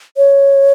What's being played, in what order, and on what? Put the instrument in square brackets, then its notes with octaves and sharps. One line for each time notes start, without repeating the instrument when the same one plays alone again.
[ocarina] C#5